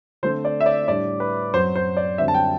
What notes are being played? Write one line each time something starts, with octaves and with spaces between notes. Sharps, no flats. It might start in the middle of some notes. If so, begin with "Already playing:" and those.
D3 A3 C4 C5
D5
E5
D5
A2 G3 D4 D5
B4
F#2 F#3 C4 C5
C5
D5
F#2 D3 G3 C4 E5
A5
G5